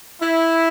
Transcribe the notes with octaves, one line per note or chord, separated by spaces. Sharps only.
E4